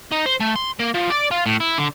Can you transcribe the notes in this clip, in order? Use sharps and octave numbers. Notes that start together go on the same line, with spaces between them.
D#4
C5
A3
C6
A#3
F3
D5
F4
A2
E4
D3